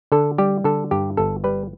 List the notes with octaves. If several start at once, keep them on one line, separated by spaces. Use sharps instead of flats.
D3 A4
G3 G4
D3 A4
G2 G4
G1 A4
G3 B4